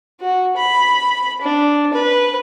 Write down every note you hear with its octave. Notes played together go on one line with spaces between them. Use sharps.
F#4
B5
D4
B4